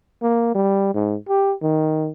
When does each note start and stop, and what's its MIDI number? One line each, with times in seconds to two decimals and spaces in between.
0.22 0.51 58
0.55 0.91 55
0.94 1.15 44
1.29 1.53 67
1.62 2.10 51